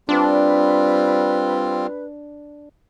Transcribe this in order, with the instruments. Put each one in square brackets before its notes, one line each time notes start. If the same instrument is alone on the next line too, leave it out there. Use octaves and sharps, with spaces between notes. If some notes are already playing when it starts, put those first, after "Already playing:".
[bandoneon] G3 C4 F4 [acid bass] D4 [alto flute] B4